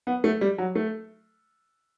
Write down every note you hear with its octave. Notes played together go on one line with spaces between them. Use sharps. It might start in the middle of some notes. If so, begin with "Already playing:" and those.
B3
A3
G3
F#3
A3